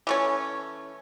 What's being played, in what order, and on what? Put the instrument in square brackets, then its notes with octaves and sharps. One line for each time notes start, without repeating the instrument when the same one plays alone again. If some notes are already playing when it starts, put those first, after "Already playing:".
[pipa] E3 A3 C#4